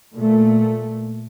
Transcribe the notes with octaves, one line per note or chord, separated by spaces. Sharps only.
A#2 A3